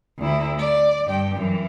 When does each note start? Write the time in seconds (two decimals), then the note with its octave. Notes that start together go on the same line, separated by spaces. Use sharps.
0.18 D2 E4
0.59 D5
1.07 G2 G5
1.36 F#2 E3